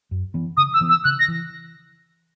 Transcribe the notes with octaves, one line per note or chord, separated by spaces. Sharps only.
F#2
E3 B3
C#3 D#6
E6
E3 B3
E6
C#3 F#6
A#6
E3